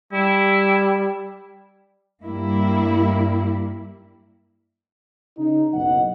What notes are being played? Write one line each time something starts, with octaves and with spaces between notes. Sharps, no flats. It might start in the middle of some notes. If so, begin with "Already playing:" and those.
G3 E4
G2 G3 A#3 E4
C#3 D#4
F#1 B1 D#5 F#5